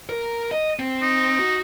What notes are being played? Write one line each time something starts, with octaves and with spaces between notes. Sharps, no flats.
A#4
D#5
C4
D#4
F#4